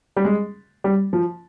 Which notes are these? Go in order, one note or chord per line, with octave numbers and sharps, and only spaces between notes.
G3
G#3
G3
F3